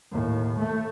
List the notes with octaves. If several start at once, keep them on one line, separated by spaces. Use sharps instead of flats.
D#2 A2
A3